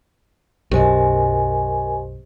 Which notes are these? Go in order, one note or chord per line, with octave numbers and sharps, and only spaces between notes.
B1 F#2 G4 A#4 C5 D#5 G#5